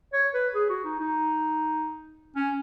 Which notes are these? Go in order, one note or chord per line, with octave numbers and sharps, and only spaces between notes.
C#5
B4
G#4
F#4
D#4
D#4
C#4